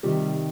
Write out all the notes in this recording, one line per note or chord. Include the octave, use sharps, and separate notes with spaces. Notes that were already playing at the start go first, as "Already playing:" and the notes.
C3 D#3 G3 G4